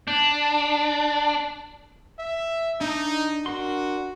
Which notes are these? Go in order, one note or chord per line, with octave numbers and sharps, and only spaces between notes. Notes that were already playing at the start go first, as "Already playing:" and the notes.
D4
E5
D4 D#4
D4 F#4 A#4 C6